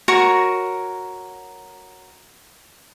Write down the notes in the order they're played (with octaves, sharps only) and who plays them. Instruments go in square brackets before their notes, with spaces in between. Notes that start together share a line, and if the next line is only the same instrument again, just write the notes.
[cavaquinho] F#4 A#4 C#5 C#6